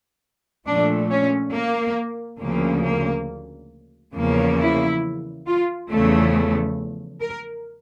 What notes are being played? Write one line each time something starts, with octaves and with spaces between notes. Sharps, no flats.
A#2 F3 A3 D4
C#4
A#3
D2 C#3 F3 A#3
A#3
E2 C#3 F3 A#3
E4
F4
E2 C#3 F3 A3
A#4